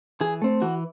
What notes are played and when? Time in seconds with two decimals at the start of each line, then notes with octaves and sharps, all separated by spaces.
0.21 E3 G#4
0.42 A3 C4
0.62 E3 F#4